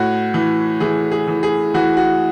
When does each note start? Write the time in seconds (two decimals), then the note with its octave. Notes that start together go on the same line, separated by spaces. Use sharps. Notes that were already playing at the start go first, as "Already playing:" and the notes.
Already playing: A2 F#4
0.34 E3
0.80 E3 G#4
1.11 G#4
1.28 E3
1.43 G#4
1.74 E3 F#4
1.97 F#4